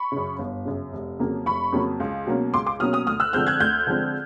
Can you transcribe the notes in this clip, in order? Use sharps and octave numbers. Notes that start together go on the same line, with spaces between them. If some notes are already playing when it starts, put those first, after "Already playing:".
Already playing: B5 C#6
F#2 C#3
G1
F#2 C#3
F1
F2 C#3 F#3 A#3
F1 B5 C#6
F2 C#3 F#3 A#3
C#2
B2 F#3 A#3 C#4
C#2 C6 D6
C6 D6
B2 F#3 A#3 C#4 D#6 F6
D#6 F6
D2 D#6 F6
E6 F#6
D3 F3 G#3 C4 F6 G6
F#6 G#6
D2 F6 G6
D3 F3 G#3 C4